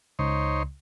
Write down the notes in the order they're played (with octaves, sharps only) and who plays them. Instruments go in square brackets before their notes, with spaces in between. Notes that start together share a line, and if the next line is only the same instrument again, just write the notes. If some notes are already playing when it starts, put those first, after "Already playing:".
[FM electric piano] C#2 [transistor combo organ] D#4 C5 C#5